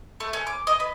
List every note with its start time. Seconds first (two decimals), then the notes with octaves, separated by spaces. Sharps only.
0.20 A3
0.33 C#4
0.47 D6
0.67 D#5
0.80 B4